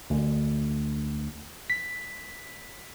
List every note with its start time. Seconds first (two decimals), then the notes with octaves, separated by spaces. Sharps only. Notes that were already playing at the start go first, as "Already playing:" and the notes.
0.10 D2
1.70 B6